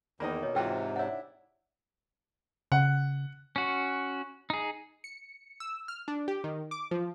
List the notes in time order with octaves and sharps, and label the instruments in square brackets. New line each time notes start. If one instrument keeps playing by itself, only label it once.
[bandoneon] E2 D#3 [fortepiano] A#3 D#4 [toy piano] C5 D5 B5
[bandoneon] B2 [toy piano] C#5 D#5
[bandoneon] G#2 C3 [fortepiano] E3 F4 F#4 [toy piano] G#4 G5
[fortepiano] D4 E4 [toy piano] C#5 F#5
[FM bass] C#3 [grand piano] F#5
[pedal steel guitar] C#4 F#4
D#4 G#4
[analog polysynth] C#7
E6
F6
D4
G4
D#3
D6
F3